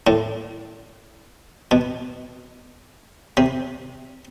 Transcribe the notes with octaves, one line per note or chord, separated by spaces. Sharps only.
A2
B2
C3